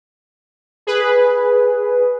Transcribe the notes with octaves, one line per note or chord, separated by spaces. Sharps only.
G#4 B4